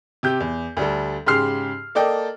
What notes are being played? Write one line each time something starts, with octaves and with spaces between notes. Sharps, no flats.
C3 G4 G6
E2
D2 G3 A4
G#2 C#3 G4 C6 F6 C7
A#3 A4 D5 D#5 G5